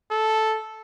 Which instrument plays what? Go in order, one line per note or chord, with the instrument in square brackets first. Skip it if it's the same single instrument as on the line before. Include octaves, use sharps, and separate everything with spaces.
[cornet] A4